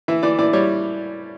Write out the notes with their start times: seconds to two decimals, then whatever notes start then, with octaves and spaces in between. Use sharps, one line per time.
0.08 E3 E5
0.23 E3 D5
0.39 E3 D5
0.53 G3 C#5